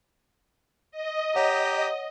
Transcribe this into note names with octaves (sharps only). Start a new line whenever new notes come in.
D#5
G4 C#5 F#5 A#5